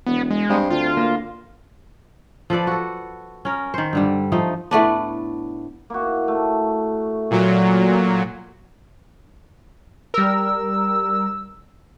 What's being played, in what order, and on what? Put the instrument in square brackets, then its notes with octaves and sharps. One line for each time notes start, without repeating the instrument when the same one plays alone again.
[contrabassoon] E1 [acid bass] B3
[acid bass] G#3
[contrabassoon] G2 [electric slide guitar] C4
[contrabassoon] D2 [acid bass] F4
[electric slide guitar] A#3
[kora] F3 A4 B4 D5
F#4 A4
C#4 A#4
D#3 C5
G2 D3 G3
F3 A3 D#4
A2 A3 B3 D4
[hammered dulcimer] A#3 E4 F#4
A3
[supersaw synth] A#2 F#3
[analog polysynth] G3 A#4 [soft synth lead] E6